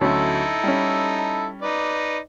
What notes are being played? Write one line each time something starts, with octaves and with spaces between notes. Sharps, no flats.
D2 F#3 C#4 D#4 E4 A4
G3 C#4
D#4 B4 D5